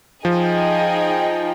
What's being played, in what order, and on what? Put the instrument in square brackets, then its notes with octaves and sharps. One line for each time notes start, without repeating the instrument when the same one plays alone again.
[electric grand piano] F3 [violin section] D#4 G#4 D#5 G5